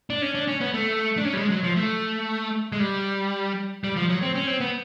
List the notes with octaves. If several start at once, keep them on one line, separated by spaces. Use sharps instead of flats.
D4
C#4
D4
C#4
B3
A3
D4
C#4
G3
G#3
F#3
F3
A3
G#3
G3
G3
F3
F#3
C4
C#4
C4
B3